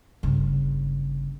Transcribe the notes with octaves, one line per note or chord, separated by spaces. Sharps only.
G1 C#3